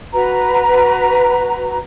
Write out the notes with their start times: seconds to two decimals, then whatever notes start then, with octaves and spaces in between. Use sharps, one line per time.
0.14 F#4 B4 A#5